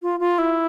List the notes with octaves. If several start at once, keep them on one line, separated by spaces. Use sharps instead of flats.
F4
F4
E4